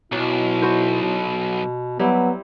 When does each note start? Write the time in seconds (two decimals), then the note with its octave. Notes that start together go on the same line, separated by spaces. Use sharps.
0.12 B1 B2 F#3 E4
0.62 F#4 B4 C5
1.02 B2
1.99 F#3 G3 B3 C4 E4